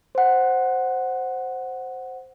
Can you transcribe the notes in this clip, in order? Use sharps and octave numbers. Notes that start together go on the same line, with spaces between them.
C5 F#5